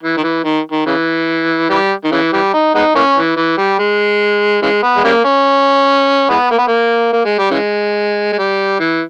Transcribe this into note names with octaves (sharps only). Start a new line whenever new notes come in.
E3
D#3
E3
D#3
D#3
C#3 E3
E3 G3
D#3
C#3 E3
E3 G3
D#4
G#3 B3 D#4
E3 A#3 C#4
E3
E3
G3
G#3
C#3 E3 G#3
B3
G#3
C#3 G3 A#3
C#4
E3 G#3 B3
A#3
B3
A#3
A#3
G#3
G3
C#3 E3 G#3
G#3
G3
E3